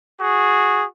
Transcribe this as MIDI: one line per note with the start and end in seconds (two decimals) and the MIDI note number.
0.20 0.84 66
0.20 0.84 68